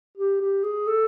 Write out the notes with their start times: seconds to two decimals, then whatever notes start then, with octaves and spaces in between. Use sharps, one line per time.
0.17 G4
0.41 G4
0.64 G#4
0.87 A4